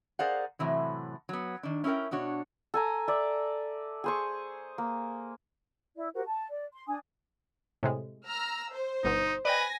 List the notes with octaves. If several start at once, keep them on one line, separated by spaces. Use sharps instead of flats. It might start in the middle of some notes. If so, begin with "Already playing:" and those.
G#4 A#4 C5 D5 F5 F#5
A2 C3 E3 F#3
F#3 B3
D#3 D4
C#4 E4 F4 A#4 G5
B2 D4 F#4 C#5
A4 G#5 A#5
D5 E5
G#4 C5 C#6
A#3
E4 D5
F#4 G4 A#4 C5
A5
D5
C6
D4 G#5 D#6
A2 C3 G#3
A#5 E6 F6
C5
G1 B2 D#4
B4 D5 D#5 G5 G#5 A#6